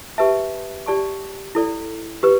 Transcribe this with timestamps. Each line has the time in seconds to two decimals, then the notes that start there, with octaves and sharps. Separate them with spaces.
0.18 G4 B4 E5 A5
0.86 G4 D5 A5 C#6
1.55 E4 A4 D5
2.23 G4 B4